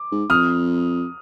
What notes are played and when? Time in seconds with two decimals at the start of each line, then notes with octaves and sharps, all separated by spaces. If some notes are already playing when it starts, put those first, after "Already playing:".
Already playing: D6
0.12 G#2
0.29 F2 D#6 F6